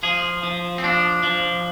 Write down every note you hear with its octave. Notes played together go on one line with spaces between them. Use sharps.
F3 G#4
F3
C4
F3 D4
F3